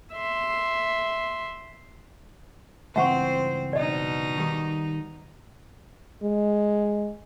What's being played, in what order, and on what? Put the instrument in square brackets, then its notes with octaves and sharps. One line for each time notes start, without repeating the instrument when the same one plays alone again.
[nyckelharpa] E5 C6
[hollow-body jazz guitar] C#2 G2 E3 [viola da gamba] C4 C5 [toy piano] E5 F#5 C#6
[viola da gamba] B2 D#4 [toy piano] D5 D#5
[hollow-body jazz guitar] D#3 G3
[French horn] G#3